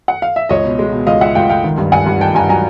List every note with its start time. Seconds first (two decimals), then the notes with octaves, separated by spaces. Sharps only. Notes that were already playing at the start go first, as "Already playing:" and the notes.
0.08 F#5
0.22 F5
0.36 E5
0.49 C#2 C#5 D#5
0.65 B2
0.79 G#3
0.93 B2
1.07 C#2 D#5 F5
1.21 C#2 E5 F#5
1.35 C#2 F5 G5
1.49 C#2 F5 G5
1.64 D#3
1.78 G2
1.92 G2 F#5 G#5
2.06 G2
2.21 D#3 G5 A5
2.35 G2 G#5 A#5
2.49 F#3 G#5 A#5